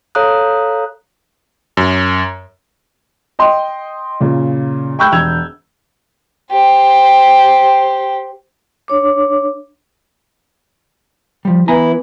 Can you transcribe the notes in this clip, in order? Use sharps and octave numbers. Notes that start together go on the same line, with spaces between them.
A4 C#5 F5 A#5 D#6 F#6
F#2
D#5 G5 C6
A#2 C#3
G5 B5 C#6 E6 F#6 G6
E1 E6 G#6 F7
G4 C5
D4 C#5 D6
F3 G3
E3 B3 E4 G#5 A#5